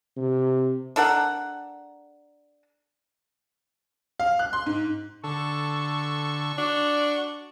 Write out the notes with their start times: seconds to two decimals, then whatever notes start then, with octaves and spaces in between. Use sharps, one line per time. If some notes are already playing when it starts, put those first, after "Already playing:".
0.17 C3
0.96 D4 A4 A#4 F#5
4.20 F5
4.39 F#6
4.53 C6
4.66 G#2
5.24 D3 A4 C#6
6.58 D4 F#4